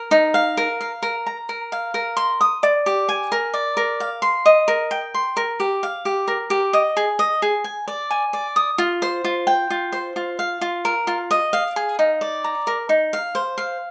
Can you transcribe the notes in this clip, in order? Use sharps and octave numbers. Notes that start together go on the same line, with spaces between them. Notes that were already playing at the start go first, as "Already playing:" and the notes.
Already playing: A#4
D#4
F5
A#4
F5
A#4
A#5
A#4
F5
A#4
C6
D#6
D5
G4
G#5
A#4
D5
A#4
F5
C6
D#5
A#4
G5
C6
A#4
G4
F5
G4
A#4
G4
D#5
G#4
D#5
G#4
G#5
D5
G#5
D5
D#6
F4
C5
F4
G5
F4
C5
F4
F5
F4
A#4
F4
D#5
F5
G#4
D#4
D5
A#5
A#4
D#4
F5
C5
F5